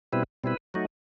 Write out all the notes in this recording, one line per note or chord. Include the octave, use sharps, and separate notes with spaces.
B2 G3 C4 E4 B4
B2 G3 C4 E4 B4
F#3 A3 D#4 F#4